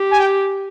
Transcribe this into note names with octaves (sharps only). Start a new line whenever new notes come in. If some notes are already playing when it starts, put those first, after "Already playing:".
Already playing: G4
G#5
G5